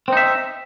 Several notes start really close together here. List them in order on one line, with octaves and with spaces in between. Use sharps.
C4 D#4 E5